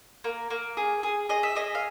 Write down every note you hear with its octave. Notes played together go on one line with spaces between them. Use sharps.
A#3
A#3
G#4
G#4
G#4 D#5
E5
G#4 D#5
F5